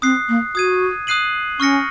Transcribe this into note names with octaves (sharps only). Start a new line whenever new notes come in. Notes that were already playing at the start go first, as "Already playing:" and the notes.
C4 D#6 F#6 C7
A#3
F#4 D#6 G#6 D#7
D#6 F#6 C7 D#7 F#7
C#4 C#6 F6 A#6 C#7